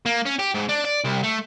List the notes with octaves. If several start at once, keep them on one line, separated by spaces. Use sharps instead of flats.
A#3
C#4
G4
G#2
D4
D5
C2
A3